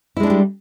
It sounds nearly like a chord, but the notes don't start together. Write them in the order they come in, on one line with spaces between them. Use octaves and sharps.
E4 G#3 D4 C#4 G3